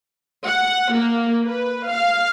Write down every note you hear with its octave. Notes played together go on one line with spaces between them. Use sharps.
F#5
A#3
B4
F5